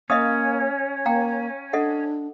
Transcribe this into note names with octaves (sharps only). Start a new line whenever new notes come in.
A#3 C#4 D#5 F5 D#6
A#3 F5 G5 A#5
D4 A4 D#5 F#5